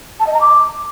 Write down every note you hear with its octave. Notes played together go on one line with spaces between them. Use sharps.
A5
D#5
A#5
D6